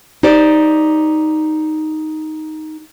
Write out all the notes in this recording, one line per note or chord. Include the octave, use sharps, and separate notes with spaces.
D#4 G4 C5 D5